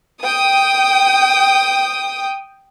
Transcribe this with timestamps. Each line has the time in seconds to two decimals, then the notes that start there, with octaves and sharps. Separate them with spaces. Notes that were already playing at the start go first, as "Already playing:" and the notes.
0.22 G5 D#6